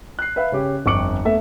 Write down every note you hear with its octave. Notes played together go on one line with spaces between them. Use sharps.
F#6 C7
B4 E5 F5
C#3 C#4 G4
G1 F2 C#6 D6 C#7 F#7
A3 B3 A4 E5